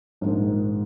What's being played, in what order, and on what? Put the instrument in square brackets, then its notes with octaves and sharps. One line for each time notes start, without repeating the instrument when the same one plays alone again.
[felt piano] A#1 G#2 D#3 G#3